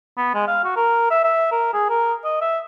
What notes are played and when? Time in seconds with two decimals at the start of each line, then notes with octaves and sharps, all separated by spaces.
0.17 B3
0.34 G#3
0.47 F5
0.64 F#4
0.76 A#4
1.10 E5
1.24 E5
1.51 A#4
1.73 G#4
1.90 A#4
2.24 D#5
2.41 E5